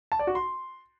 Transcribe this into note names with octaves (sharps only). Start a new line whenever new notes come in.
A5
D5
F#4
C6